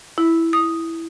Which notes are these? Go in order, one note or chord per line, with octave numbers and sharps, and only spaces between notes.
E4
D#6